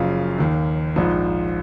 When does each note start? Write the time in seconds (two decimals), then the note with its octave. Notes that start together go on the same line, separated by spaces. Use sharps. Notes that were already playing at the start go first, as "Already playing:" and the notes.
Already playing: F#1 F#2 C#3 F3 F5
0.38 D#2 D#3
0.96 A#1 G#2 F3